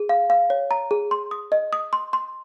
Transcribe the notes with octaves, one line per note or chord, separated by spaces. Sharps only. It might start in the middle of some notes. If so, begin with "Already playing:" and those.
Already playing: G#4
F5
F5
C#5
A#5
G#4
C6
D#6
D#5
D#6
C6
C6